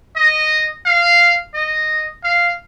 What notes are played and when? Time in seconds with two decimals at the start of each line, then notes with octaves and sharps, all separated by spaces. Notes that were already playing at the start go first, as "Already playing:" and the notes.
0.16 D#5
0.86 F5
1.54 D#5
2.24 F5